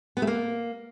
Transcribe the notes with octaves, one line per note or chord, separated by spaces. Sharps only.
B3
A3
A#3